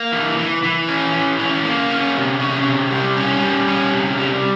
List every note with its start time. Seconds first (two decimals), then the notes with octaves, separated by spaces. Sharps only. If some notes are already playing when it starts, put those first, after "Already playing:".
Already playing: A#3
0.12 E3
0.37 E3
0.63 E3
0.89 C#4
1.13 E3
1.39 C#4
1.65 A#3
1.90 C#4
2.16 C3
2.40 C#4
2.66 C3
2.91 G3
3.17 C#4
3.42 G3
3.68 C#4
3.92 C3
4.18 G3